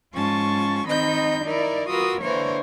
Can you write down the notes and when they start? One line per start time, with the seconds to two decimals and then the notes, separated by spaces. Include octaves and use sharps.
0.14 G#2 C#4 F4 A5 C#6
0.87 D#3 C4 D#4 D#5 B5 G6
1.42 D#4 E4 A#4 D5
1.89 F4 F#4 A#4 B4 D#6 E6
2.21 D3 E3 A#3 D4 C5 C#5